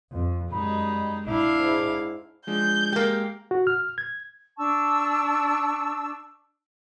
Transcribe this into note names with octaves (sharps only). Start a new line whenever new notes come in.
F2
F#2 G3 G#3 D#4 B5
D4 E4 F5
G#2
F3 G#3 D4 G6
G#3 A#3 G4
F#4
F6
G#6
D4 A5 C#6 E6